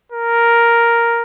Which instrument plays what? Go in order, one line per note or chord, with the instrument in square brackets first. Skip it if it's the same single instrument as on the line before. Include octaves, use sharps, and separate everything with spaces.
[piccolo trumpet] A#4